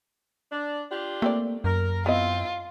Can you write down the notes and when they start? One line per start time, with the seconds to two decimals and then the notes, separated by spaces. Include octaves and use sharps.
0.52 D4
0.91 D4 F4 G4
1.22 A3 A#3 C4 D5
1.64 F#2 A#4
2.06 B3 C4 E4 F4 D#5